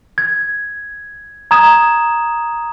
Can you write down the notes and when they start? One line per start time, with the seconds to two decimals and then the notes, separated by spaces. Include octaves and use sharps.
0.18 G#6
1.51 A#5 D#6 G#6 E7